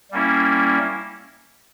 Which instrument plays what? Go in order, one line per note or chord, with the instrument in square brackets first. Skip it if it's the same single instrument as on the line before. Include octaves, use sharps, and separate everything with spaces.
[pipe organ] G3 A#3 C#4 E4